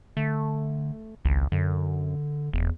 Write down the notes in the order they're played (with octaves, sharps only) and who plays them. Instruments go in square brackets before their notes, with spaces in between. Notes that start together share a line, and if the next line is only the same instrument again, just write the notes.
[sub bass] D3 [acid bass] A3
[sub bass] G#1 [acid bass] C#2
[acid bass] F#2 [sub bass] D3
[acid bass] F1 [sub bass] E2